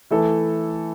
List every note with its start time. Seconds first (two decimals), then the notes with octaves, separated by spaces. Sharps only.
0.11 E3 A3 E4 A4